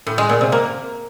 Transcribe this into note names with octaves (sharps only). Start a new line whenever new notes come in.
A2
G#3
A#2
C3
A#3